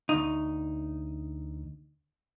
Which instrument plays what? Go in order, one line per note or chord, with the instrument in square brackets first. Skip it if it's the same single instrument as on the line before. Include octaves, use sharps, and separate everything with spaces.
[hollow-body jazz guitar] D2 D#4